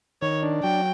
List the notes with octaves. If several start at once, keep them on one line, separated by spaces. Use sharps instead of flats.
D#3 C#5
D4
F#3 G5